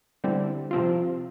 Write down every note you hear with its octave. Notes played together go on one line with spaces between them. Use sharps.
D3 G3 C4 E4
C3 F3 C4 F4